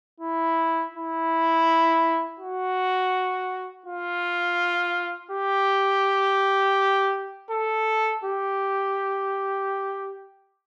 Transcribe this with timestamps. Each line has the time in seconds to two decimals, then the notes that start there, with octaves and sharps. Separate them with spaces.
0.20 E4
0.94 E4
2.40 F#4
3.87 F4
5.32 G4
7.51 A4
8.25 G4